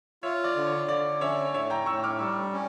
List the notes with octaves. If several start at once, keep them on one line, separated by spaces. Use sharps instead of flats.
F4 C#5 E5
D5
D3
C#5
D3 D5
C#4 C#5 E5
A2 C#5 E5
G5 A#5
A2 C#6 E6
D6 F6
G3 C#6 E6
C#4